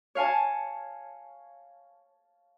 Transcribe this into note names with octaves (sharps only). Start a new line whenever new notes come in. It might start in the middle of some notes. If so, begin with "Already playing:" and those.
C#5 F5 G#5 A5